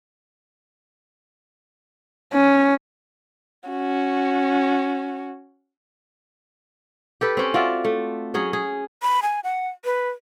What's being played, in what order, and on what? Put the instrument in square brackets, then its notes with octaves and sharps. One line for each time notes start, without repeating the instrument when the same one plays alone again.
[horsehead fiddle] C#4
[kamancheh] C#4 F#4
[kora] G4 A4 B4
C4 C#4
F4 F#4 D5 E5
A3
F#3 C#4 G#4
G#4
[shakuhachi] B5
G#5
F#5
B4